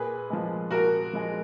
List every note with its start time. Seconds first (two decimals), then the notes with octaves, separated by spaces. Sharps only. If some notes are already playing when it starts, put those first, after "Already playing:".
Already playing: A#2 G#4 B4
0.30 F3 G#3
0.71 A#2 F#4 A#4
1.13 F3 G#3